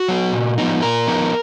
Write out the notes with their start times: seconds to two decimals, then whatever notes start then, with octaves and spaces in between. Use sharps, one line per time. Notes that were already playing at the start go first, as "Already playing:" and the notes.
Already playing: F#4
0.08 F#3 B3
0.32 A#2
0.58 F3 B3 D#4
0.82 A#2 A#4
1.07 F3 B3 D#4